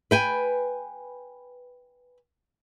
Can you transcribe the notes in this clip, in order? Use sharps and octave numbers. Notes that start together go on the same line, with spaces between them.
B4 G5 G#5